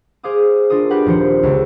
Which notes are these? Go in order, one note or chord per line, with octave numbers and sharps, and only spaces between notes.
G#4 C5 F5 D6 D#6
D4 F4 A#4 D#6
G4 A#4 B4 D5 F#5 G5
D#1 F3 C4 C5 C7 C#7
C#2